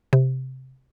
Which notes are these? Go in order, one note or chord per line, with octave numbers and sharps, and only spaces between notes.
C3